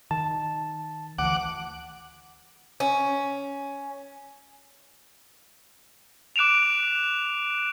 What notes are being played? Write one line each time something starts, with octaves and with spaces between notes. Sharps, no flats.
D#3 A5
D2 E3 F#5 D6
C#4
D6 F#6 D7 E7 F7